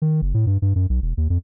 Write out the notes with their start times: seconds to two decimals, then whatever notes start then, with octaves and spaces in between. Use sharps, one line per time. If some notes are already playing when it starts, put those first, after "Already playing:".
0.02 D#3
0.22 F#1
0.34 A2
0.47 G2
0.62 G2
0.76 F#2
0.89 B1
1.02 E1
1.17 D#2
1.30 F2